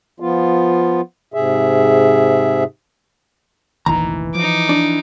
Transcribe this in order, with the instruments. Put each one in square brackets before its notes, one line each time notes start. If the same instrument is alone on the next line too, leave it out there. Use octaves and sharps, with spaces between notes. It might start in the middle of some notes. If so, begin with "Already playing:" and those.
[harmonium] F3 B3 F4
G#2 C3 G#4 E5
[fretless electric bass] F1 A#1 D#3 [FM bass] E3 [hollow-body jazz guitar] A#5
[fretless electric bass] F3 [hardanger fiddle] D#4 D6
[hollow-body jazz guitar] D4